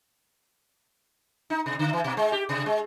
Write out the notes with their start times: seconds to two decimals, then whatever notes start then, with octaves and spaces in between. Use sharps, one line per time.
1.50 D#4
1.66 C3
1.79 D3
1.93 E3
2.04 B2
2.17 G#3
2.32 G4
2.49 C3
2.66 G#3